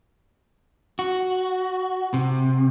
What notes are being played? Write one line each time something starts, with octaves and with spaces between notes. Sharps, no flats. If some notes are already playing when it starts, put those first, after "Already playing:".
F#4
C3